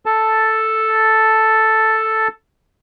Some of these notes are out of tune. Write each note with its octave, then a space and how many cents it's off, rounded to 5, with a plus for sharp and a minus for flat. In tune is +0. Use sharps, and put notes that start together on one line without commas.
A4 +0 A5 +0